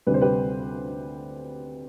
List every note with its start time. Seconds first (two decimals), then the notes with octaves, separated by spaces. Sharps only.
0.07 D2 C3 G3 B4
0.14 C5
0.21 G4 B4